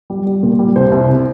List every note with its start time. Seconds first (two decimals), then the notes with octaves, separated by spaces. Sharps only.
0.10 G3
0.26 G3
0.43 A#2
0.59 G3
0.76 C2 C5
0.92 C2
1.08 C3